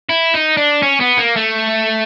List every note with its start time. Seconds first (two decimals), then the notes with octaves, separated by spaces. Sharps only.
0.09 E4
0.34 D#4
0.57 D4
0.82 C#4
1.00 B3
1.18 A#3
1.36 A3